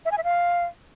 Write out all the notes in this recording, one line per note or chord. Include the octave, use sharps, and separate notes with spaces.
E5
G#5
E5
F5